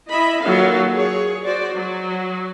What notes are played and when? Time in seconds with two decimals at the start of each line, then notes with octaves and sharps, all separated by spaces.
0.10 E4 D#5 E5 B5
0.45 D#3 F#3 A#3 F4 A4 F5
0.94 G#4 C#5
1.44 F#4 C5 D5
1.74 F#3